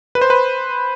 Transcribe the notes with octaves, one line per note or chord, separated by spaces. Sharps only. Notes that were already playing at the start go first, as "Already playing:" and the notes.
B4
C5
B4